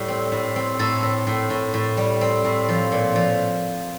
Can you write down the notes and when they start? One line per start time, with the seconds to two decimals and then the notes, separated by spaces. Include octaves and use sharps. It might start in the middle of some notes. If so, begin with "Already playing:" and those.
Already playing: A2 G3
0.08 C4
0.32 A2
0.56 C4
0.79 A2 A4
1.03 A2
1.27 A2
1.50 A2
1.74 A2
1.97 G3
2.21 C4
2.45 A2
2.69 F3
2.92 A#2
3.16 F3